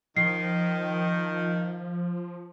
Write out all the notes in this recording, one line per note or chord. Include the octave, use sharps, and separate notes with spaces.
D#3 F3 C7